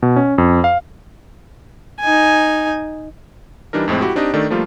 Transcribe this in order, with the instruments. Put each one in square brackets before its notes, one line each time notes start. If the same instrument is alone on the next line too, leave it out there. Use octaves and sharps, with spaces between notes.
[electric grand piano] B2
C#4
F2
F5
[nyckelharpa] D#4 G#5
[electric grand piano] E3 G3 D4 D#4 A#4
F2 A2 G#3 C4
E4 F#4 G4
C4 D4 D#4 G4 D#5
D#3 A3 D4 A4 D5
F3 G3 A3 A#3 F4